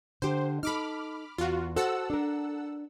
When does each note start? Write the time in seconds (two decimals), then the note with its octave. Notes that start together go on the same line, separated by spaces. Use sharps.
0.22 D3 G4 C5
0.63 D#4 A4 B5 D6 F6
1.38 E2 F4 F#4
1.76 F#4 A4 C5 F#5 E6
2.10 D4 A#4